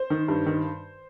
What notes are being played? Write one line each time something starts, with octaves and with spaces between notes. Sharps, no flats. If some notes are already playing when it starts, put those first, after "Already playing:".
Already playing: C5
D#3
G2
D#3